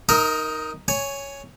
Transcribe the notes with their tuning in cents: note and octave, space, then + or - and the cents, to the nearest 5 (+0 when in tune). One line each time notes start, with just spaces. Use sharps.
D#4 +0 A#4 +0 D#5 +40
C#5 +5 G#5 +0